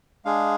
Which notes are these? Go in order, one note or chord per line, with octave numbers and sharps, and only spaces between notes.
G#3 D4 G#4 F5